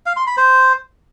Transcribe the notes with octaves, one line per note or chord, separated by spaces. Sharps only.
F5
C6
B5
C5